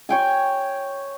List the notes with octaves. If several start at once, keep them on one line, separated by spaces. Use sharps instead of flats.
C#5 G5 G#5